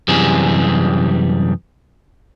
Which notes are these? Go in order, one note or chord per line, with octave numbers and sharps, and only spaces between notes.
F#2 C3 E3 G3 G#4